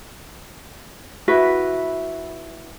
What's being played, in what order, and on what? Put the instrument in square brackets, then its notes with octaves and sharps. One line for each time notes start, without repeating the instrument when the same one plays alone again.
[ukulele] E4 F#4 B4 E5